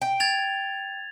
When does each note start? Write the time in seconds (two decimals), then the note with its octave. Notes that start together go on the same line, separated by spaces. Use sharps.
0.02 G5
0.20 G#6 A6 F7